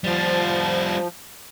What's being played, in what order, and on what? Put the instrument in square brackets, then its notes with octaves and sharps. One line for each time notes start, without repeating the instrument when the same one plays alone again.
[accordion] F3 [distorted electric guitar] G3 F4